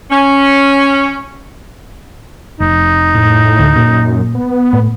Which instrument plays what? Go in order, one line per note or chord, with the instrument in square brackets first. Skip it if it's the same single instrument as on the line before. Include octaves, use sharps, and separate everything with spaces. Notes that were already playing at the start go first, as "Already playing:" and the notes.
[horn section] C#4
[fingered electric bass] F1 [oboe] D#4
[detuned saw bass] A2
[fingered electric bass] D2
[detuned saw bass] F#2 [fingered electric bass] A#2
[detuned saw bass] B3
[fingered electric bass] A2